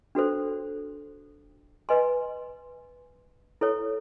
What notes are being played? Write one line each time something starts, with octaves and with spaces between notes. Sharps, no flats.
D4 F#4 A4 C5
B4 D#5 G#5 C6
E4 A4 C#5